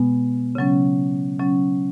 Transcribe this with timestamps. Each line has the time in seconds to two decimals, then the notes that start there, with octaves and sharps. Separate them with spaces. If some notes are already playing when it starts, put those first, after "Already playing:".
Already playing: B2 G#3 B3
0.55 C#3 F#3 C#4
1.39 C#3 F#3 C#4